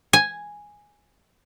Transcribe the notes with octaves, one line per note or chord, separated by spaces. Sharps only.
G#5